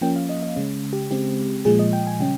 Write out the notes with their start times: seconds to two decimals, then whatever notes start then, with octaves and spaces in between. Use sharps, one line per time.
0.01 F3 A#3 C#4 G5
0.16 F5
0.29 D#5
0.43 D#5
0.56 C#3 G#3 C#4
0.93 G4
1.11 C#3 G#3 C4 G4
1.65 A#2 F3 G#3 G#4
1.79 D#5
1.93 G5
2.07 G#5
2.19 C#3 G3 C#4 G5